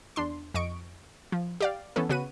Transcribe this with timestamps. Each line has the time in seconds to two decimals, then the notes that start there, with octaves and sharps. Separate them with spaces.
0.16 E2 D4 C6
0.54 F2 D#5 C#6 D7
1.32 F3
1.61 G4 D5 F5
1.96 E3 B3 C#4 A4
2.09 C#3 B3 F#4 B4 D#7